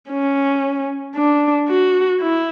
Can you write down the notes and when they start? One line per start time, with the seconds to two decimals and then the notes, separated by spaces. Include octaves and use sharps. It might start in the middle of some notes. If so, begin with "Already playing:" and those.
0.10 C#4
1.15 D4
1.69 F#4
2.21 E4